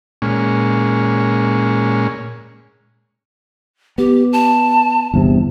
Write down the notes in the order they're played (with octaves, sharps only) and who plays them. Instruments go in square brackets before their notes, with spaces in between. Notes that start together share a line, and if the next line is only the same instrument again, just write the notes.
[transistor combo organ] A#2 G#3 C#4
[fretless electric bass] B3 [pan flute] G4
[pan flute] A5
[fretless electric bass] G1 E2 C3